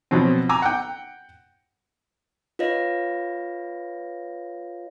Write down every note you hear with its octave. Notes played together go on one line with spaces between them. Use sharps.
B2 F3 F#3 C4
G#5 A#5 D6 E6
F#5 G5
F4 B4 C#5 D#5 F5 A#6